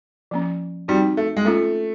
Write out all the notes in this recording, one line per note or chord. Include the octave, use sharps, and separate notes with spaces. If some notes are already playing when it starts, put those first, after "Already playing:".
F3 A#3 C#4
G3 C4 D#4 F#4
A3
G#3
A3 A#3 C#4 F4